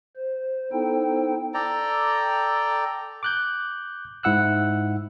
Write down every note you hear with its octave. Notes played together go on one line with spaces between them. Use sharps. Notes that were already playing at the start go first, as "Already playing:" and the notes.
C5
B3 D#4 E4 A4 C5 G5
A4 D5 G5 A#5
D6 F#6 G6
G#2 E4 F#5 E6 F#6